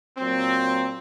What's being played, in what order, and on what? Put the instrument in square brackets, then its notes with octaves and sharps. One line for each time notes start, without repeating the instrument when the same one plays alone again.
[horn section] A#2 F#3 C4